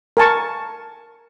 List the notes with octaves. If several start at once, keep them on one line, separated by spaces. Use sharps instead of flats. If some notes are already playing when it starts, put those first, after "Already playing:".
A#4 G#5 A5 C#6